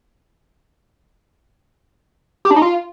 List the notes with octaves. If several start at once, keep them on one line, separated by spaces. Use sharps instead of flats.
G4
D4
D#4
F4